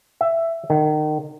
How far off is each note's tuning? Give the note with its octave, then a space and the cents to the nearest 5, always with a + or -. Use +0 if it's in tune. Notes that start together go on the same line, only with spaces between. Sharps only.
E5 +10
D#3 -30